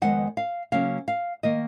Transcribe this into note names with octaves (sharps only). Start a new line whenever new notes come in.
F2 D#3 G#3 B3 F#5
F5
C#3 F#3 A#3 C#4 F5
F5
D#3 A#3 D#5